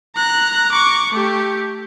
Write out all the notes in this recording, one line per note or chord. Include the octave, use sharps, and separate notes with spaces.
A#5 F#6
C#6 D6
A3 G4